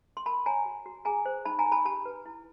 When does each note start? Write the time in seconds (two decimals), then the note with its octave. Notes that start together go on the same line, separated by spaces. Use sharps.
0.17 C6
0.26 A#4 A5 B5
0.46 C#5 G#5 A#5
0.65 F#4
0.86 F#4
1.05 G#4 G#5 A#5
1.26 C5
1.45 D#4 A5 B5
1.59 G#5 A#5
1.66 D#4
1.72 A5 B5
1.85 G4 A5 B5
2.05 B4
2.26 E4